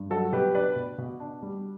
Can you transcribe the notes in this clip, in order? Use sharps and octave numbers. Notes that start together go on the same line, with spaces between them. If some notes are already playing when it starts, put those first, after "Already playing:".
Already playing: G2
F#3 F#4 A4
B2 G4 B4
D4 B4 D5
B2
B2
D4
G3